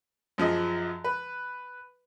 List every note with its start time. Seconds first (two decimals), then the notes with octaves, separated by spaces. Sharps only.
0.38 F#2 F3 G#4 D#5
1.04 B4